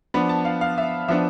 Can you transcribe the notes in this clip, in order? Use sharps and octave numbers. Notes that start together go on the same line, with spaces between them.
F3 B3 D4 B5
A5
F5
F5
E5
F3 B3 D4 E5